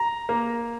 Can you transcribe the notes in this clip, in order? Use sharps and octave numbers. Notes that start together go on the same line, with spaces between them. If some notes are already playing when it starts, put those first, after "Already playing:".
Already playing: A#5
A#3